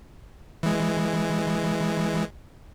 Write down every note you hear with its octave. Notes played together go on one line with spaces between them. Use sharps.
E3 G#3